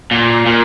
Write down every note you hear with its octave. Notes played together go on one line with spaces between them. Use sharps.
A#2
A#2